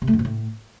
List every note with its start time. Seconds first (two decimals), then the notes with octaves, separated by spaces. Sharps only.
0.02 C3
0.07 A3
0.13 F#2
0.19 B2
0.25 A2